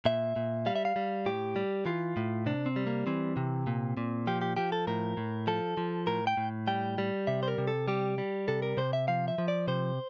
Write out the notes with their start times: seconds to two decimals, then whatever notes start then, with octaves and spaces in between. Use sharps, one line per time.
0.05 A#2 E5
0.36 A#2
0.66 G3 F5
0.76 E5
0.85 F5
0.96 G3
1.26 A2 G4
1.56 G3
1.86 E3 F4
2.17 A2
2.46 C3 D4
2.66 C4
2.76 G3
2.87 A#3
3.07 E3 C4
3.37 C3
3.67 A#2
3.97 A#2
4.27 F3 G4
4.42 G4
4.57 F3 G4
4.72 A4
4.87 A2 A#4
5.17 A2
5.47 F3 A4
5.77 F3
6.07 A2 A#4
6.27 G5
6.37 A2
6.67 G3 G5
6.98 G3
7.27 C3 E5
7.43 C5
7.48 A#4
7.58 C3
7.68 A4
7.88 G3 G4
8.18 G3
8.48 C3 A4
8.62 A#4
8.77 C3 C5
8.93 E5
9.08 F3 F5
9.28 E5
9.38 F3
9.48 D5
9.68 C3 C5